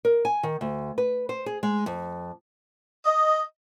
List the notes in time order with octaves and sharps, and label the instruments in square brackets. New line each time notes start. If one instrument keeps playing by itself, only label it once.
[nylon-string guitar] A#4
G#5
D#3
D2
B4
C5
G#4
G#3
F2
[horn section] D#5